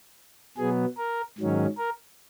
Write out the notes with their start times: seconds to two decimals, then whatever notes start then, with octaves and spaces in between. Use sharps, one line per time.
0.57 B2 F#3 B3 G#4
0.98 A#4
1.38 G#2 D#3 F#3 C#4
1.78 A#4